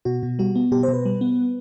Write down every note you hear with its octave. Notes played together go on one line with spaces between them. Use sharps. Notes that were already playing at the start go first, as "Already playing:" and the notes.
B2 F#4
B2
G3 F#4
B3
B2 G4
C5
B2
B4
G3
B3